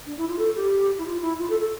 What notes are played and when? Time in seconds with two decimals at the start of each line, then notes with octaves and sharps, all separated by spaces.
0.06 D4
0.17 E4
0.28 F4
0.38 A4
0.56 G4
0.98 E4
1.05 F4
1.21 E4
1.38 F4
1.49 A4
1.60 A4